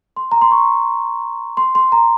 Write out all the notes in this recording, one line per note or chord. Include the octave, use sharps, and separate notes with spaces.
C6
A#5
C6
C#6
C6
C6
A#5